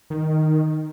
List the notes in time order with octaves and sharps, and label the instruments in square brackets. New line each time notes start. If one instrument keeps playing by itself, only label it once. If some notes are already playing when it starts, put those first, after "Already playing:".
[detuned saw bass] D#3